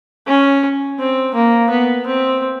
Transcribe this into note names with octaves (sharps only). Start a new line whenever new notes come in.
C#4
C4
A#3
B3
C4